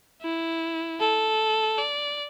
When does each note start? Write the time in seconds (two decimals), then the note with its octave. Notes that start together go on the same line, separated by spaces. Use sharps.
0.22 E4
1.00 A4
1.78 D5